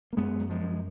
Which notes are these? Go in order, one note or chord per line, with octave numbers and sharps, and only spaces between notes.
A#3
F#2 G#3 B3
F#2
F3 G#3
F#2